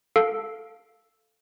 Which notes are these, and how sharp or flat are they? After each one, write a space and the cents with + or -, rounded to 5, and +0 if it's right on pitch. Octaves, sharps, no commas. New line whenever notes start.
A4 +0 F5 +0